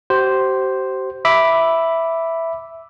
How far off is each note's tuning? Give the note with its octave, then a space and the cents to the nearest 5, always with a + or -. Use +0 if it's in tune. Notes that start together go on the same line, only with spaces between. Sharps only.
G4 -40 C5 +0
E5 +0 B5 +0 D6 +0